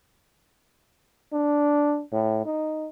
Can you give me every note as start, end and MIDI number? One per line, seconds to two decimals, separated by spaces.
1.33 2.01 62
2.12 2.42 45
2.46 2.88 63